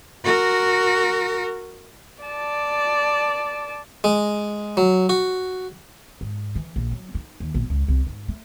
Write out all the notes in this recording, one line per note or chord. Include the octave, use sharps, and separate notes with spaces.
F#4 A#4
D5 A5
G#3
F#3
F#4
G#2
E3
A#1
F#3
D#4
D#2
A#1
C#2
C2
G#2
A3